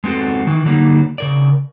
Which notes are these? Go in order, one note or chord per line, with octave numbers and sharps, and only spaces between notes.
G#3 B3 C4 F#4 A4
D#3 E3
D3 F#3 G3 A#3 D#4
C#3 A#4 D5